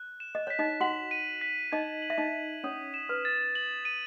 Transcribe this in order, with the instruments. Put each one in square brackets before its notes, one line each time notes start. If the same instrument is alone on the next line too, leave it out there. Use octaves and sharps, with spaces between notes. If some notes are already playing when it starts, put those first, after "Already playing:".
Already playing: [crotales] F#6
E7
[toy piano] D#5
[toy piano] C#5 [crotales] B6
[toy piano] D#4 D#5
[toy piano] F#4 F#5 [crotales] F#7
[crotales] D#7
B6
[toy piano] D#4 D#5 [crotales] G#6
[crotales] F#7
[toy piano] E5
D#4 D#5
[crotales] D#7
[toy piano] C#4 C#5 [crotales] D#6
[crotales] E7
[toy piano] B4
[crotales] A6
F#7
D#7